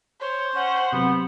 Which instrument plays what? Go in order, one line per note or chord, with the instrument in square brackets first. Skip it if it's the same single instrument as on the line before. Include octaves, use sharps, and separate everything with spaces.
[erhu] C5 [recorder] C#5
[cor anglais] C#4 [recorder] F#5
[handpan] C3 F#3 C4 [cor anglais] B3